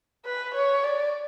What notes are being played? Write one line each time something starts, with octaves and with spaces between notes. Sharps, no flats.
B4
C#5
D5